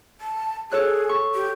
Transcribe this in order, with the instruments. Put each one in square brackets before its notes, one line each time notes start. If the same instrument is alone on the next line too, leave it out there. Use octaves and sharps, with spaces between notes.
[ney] A5
[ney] G#4 [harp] A4 C#5 F#6
[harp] C#6
[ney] G4